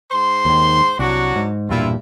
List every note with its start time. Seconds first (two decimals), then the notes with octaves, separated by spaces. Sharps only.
0.11 G#2 C5 C6
0.45 D#2 D#3
0.99 C2 F#3 D4 F#4
1.36 G#2
1.69 E1 G2 A#2 E4 F4